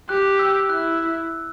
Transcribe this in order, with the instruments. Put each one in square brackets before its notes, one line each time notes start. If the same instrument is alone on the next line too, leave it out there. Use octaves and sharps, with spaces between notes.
[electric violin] G4 [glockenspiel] F#6
[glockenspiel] E6
[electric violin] E4 [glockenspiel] F#6